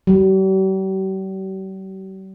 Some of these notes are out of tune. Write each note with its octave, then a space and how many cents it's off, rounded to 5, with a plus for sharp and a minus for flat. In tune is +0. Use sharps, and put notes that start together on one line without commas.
G3 -45